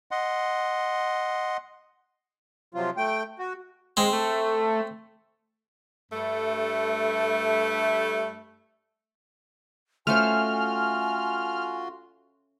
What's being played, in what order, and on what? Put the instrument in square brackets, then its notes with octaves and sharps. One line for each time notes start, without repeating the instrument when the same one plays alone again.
[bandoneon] D#5 F#5 C6
[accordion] C3 F3 F#3 F4
A3 G5
F#4
[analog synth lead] G#3 [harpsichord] C4
[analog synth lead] A3
[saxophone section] G2 A3
[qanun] A3 C#4 C5 [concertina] F4 F#4 C6 [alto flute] G#5 [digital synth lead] F6